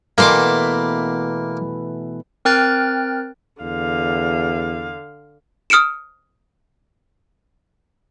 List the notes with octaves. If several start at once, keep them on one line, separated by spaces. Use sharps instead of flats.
B2 E3 A3 A#3 C6 D6
C4 A#4 G5 F6 F#6 A6
E2 D3 F5
D#6 F6 C#7 D7 E7